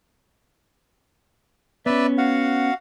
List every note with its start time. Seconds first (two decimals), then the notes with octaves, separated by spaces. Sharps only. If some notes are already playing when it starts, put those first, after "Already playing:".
1.86 B3 C#4 B4 D5 E5
2.18 F#4 F5 F#5